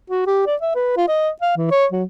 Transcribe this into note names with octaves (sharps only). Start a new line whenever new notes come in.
F#4
G4
D5
E5
B4
F4
D#5
F5
E3
C#5
F#3